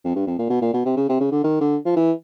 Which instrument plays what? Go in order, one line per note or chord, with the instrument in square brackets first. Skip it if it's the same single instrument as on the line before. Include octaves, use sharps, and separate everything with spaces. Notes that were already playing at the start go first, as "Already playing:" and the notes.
[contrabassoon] F2
G2
F2
A#2
B2
A#2
B2
C3
C#3
C3
C#3
D3
D#3
D3
F3
E3